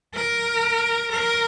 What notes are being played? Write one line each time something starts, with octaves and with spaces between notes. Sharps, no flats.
A#4
A#4